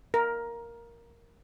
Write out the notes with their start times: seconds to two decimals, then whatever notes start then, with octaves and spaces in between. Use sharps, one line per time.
0.14 A#4